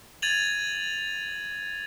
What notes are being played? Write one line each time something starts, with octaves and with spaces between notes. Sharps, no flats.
G#6 A6 D#7 F7 F#7